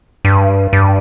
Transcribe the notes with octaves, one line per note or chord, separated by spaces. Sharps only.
G2
G2